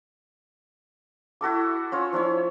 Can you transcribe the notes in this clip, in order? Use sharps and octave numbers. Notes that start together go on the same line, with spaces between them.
E4 F#4 A4 D6
C#4 F4 C#5
F3 D4 E4 C#5